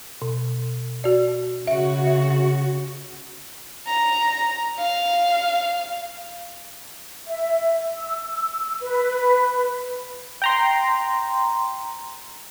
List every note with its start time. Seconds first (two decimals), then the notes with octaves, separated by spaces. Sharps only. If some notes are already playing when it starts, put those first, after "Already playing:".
0.22 B2
1.04 F#4 D5
1.67 C#3 F#4 E5
2.06 E5
3.87 A#5
4.79 F5
7.27 E5
7.95 E6
8.81 B4
10.42 G5 A#5 C6